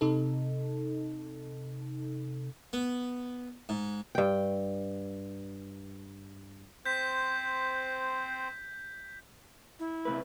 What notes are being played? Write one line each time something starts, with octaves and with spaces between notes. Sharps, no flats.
C3 D#4 A4
B3
G#2
G2 G5
C4 C5 G6 B6
E4
C3 A3 B4